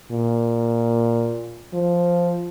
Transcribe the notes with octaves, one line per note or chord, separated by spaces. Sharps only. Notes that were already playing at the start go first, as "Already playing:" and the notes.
A#2
F3